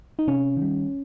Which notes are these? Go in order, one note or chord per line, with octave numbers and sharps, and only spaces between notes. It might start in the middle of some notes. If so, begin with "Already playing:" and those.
D#4
C3 C#4
D#3
G3